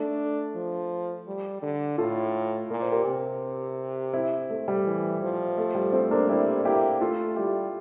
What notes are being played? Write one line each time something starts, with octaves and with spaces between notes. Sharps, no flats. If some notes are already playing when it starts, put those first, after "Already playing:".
Already playing: A3 D4
F3
G3
D3
A2 F4 A4
A#2 A#4
C5
G4 A#4
C3
C4 E4
A3
G3
E3
F3
A3
G3
A3 C4
A#3 D4
G3 C4 E4
A#3 E4 G4
A3 F4 A4
G3 E4 G4